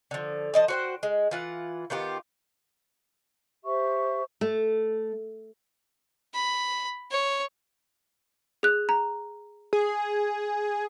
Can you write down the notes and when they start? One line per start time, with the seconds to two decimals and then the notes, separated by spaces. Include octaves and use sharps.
0.11 D3 F3
0.54 F3 D#5 A5
0.68 F#4 C5 G5
1.03 G#3
1.31 E3 F4 F#5
1.90 D#3 B3 F4 G4
3.64 G4 C5 E5 C#6
4.41 A3
6.34 B5
7.11 C#5
8.63 G#4 F#6
8.89 A#5
9.73 G#4